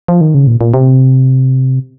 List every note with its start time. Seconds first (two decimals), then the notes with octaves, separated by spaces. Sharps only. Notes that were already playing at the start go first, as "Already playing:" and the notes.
0.08 F3
0.21 D#3
0.34 C#3
0.47 A#2
0.61 A#2
0.74 C3